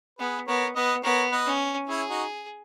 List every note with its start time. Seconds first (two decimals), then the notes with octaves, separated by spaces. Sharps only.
0.19 B3 G#4 B4
0.47 B3 A#4 C#5
0.75 B3 B4 D#5
1.04 B3 A#4 C#5
1.32 B4 D#5
1.46 C#4
1.88 C#4 E4 G#4
2.09 D#4 F#4